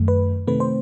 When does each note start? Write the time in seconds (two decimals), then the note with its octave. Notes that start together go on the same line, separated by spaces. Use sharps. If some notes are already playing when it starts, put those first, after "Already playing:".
Already playing: F#2 D#3 A3
0.08 B4
0.47 C3 D#3 A3 C4 B4
0.60 C5